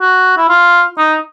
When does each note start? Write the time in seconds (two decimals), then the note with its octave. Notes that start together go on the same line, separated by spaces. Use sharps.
0.01 F#4
0.38 E4
0.49 F4
0.98 D#4